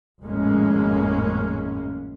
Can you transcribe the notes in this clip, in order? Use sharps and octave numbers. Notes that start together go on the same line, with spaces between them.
G#1 F2 A2 G#3 A#3 C#4